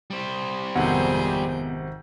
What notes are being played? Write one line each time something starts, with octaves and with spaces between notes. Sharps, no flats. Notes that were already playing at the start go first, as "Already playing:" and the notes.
G3 C5
G#1 F2 C3 B3 G#4 F#5 G6